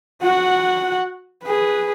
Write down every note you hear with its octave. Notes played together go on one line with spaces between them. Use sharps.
F#4 F#5
G#4 B4